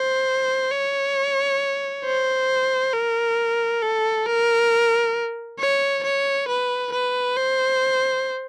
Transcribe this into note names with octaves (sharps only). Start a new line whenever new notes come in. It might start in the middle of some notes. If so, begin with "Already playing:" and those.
Already playing: C5
C#5
C5
A#4
A4
A#4
C#5
C#5
B4
B4
C5